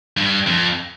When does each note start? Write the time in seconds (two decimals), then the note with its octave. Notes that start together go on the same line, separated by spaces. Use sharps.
0.17 G2
0.47 F2